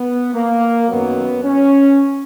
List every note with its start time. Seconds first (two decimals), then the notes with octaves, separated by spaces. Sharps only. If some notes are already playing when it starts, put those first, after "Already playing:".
Already playing: B3
0.34 A#3
0.89 F#2 D#3 F#3 B3
1.44 C#4